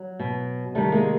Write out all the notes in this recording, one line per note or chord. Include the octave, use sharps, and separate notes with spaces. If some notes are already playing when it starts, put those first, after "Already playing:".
Already playing: F#3
B2
C3 D#3 G3 A3
G#3 A#3